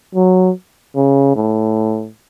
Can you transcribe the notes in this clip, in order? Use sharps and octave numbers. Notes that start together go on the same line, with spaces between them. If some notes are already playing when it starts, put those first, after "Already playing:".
F#3
C#3
A2